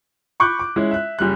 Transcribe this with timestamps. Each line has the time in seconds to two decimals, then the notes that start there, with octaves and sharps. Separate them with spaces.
0.40 B5 C#6 D6 F#6 G6
0.59 D6
0.76 G#3 C#4 E4
0.91 E5 F#6
1.19 F#1 G3 F#6